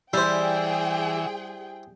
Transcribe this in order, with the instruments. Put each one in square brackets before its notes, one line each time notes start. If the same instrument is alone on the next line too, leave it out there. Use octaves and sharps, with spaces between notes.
[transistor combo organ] E3 [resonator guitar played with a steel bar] G3 [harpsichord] E4 C5 [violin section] G#4 G5